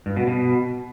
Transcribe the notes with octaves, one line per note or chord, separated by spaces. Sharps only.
G2
B2
B2